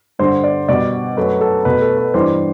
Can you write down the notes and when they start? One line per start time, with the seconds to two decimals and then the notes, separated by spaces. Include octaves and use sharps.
0.19 G2 D3 G3 C5
0.44 D5
0.68 B2 G3 D5
1.17 F#2 F#3 A3 B4
1.41 A4
1.65 B2 A3 B4
1.82 A4
1.98 B4
2.14 G2 E3 G3 C5